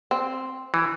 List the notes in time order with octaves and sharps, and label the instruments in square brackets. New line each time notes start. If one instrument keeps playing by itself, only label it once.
[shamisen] C4
[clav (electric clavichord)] E3